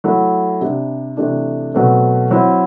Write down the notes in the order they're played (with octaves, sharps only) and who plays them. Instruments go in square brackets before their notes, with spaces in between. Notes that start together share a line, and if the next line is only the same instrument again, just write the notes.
[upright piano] F#3 A3 E4
C3 G3 D4
C3 E3 A3 D4
B2 F#3 A3 C4
F#3 C4 E4